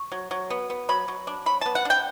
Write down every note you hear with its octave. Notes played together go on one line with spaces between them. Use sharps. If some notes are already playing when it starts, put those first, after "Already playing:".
Already playing: C#6
F#3
F#3
B3
B3
F#3 B5
F#3
D4
F#3 B5
B3 A5
F#5
D4 G5